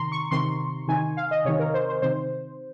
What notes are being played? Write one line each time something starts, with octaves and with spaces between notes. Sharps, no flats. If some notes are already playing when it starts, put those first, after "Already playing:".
Already playing: C3 D#3 A#5 C6
C#6
C3 D#3 C6
C3 D#3 G#5
F5
D#5
C3 D#3 C#5
A#4
C5
C5
C3 D#3 C5